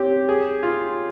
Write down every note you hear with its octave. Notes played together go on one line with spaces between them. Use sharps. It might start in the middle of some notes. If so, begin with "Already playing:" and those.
Already playing: C4 G4 C#5
G#4
F4